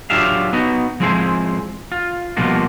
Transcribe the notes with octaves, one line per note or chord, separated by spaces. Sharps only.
F#3 D4 F4 G4 E5 F5
B3 D#4 F#4
F3 G#3 C4 E4 G#4 C5
F4
B2 F3 G3 A#3 F4 F#4